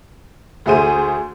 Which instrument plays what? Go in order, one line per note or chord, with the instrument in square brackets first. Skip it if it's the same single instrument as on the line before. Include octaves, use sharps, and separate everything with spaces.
[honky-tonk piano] D2 A3 G#4 C5 D#7